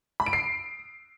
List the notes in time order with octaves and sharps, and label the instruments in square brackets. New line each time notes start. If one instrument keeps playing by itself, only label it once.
[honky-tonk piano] B5
D7
C7